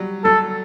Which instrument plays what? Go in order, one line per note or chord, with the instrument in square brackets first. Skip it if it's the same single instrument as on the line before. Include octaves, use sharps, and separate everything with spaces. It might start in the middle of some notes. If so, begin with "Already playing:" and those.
Already playing: [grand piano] F#3 G3
[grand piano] F#3 [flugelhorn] A4